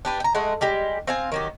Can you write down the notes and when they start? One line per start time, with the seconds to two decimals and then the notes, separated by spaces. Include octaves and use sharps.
0.05 D4 G4 B4
0.20 G5 A#5
0.35 G#3 A3 F#5
0.61 G3 G#3 G4
1.07 C4 F5 G#5
1.32 D#3 F#3 G4